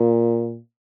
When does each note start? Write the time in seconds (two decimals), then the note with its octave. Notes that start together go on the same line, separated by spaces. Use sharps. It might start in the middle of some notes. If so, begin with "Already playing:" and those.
Already playing: A#2